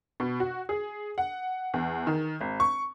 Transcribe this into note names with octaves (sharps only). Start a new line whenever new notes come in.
B2
F#4
G#4
F#5
E2
D#3
G#1
C#6